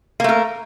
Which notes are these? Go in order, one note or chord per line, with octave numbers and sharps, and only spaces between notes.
A3 A#3 A#4